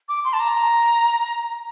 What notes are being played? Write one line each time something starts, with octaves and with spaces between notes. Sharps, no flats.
D6
C6
A5
A#5